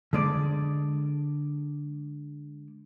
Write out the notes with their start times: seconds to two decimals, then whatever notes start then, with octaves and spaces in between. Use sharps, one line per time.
0.13 D3 G#3 D5